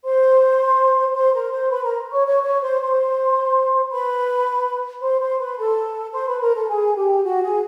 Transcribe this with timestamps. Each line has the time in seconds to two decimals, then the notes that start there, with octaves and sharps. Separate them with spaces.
0.04 C5 C6
1.14 C5 C6
1.33 A#4 A#5
1.52 C5 C6
1.70 B4 B5
1.84 A#4 A#5
2.11 C#5 C#6
2.26 C#5 C#6
2.43 C#5 C#6
2.62 C5 C6
2.80 C5 C6
3.91 B4 B5
5.02 C5 C6
5.20 C5 C6
5.39 B4 B5
5.57 A4 A5
6.12 C5 C6
6.27 B4 B5
6.41 A#4 A#5
6.54 A4 A5
6.68 G#4 G#5
6.95 G4 G5
7.23 F#4 F#5
7.41 G#4 G#5